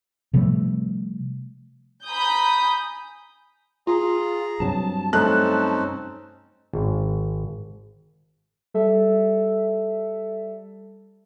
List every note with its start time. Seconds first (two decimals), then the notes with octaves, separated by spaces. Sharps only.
0.33 C3 F3 G3 A3
2.06 G#5 A#5 B5 D#6 G6
3.87 F4 G#4 A#5
4.60 G2 C3 F#3 A5
5.13 A3 C4 C#4 D#4 A5 F#6
6.73 G#1
8.74 G3 A4 E5